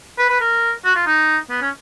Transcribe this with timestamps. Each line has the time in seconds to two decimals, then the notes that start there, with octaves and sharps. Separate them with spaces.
0.19 B4
0.30 B4
0.41 A#4
0.85 F#4
0.95 F4
1.06 D#4
1.50 B3
1.62 C#4